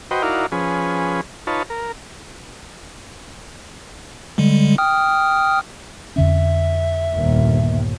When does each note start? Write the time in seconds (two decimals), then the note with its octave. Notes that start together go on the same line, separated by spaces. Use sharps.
0.11 F#4 B4 C5 D#5 G5
0.22 D#4 E4 F#4 A#4 D5 F5
0.52 F3 C#4 G#4 B4
1.47 D#4 F4 B4 C#5 A5
1.70 A#4
4.38 D3 G3 G#3
4.78 G5 D#6 F6
6.16 F2 D3 C#4 E5
7.15 G1 D#2 A#2